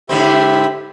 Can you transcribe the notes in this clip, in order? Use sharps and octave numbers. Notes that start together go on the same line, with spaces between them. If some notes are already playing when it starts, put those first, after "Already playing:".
G#2 D3 C4 G4 E5 B5